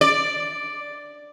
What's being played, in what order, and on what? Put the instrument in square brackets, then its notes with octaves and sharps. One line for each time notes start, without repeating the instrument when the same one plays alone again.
[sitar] D5